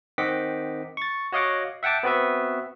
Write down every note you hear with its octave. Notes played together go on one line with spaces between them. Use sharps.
D#3 C4 D#5 F#5 D6 B6
C#6 A6
F#4 C#5 D#5 F5 F#5 D6
E5 F#5 G5 A5 D6
B3 C4 F#4 B4 E5